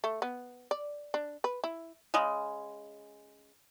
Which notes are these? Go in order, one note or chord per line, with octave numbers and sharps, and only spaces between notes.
A3
B3
D5
D4
B4
E4
C#3 G#3